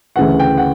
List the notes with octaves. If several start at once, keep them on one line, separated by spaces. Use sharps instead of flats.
D2 C#3 E3 F#5
G5
F#5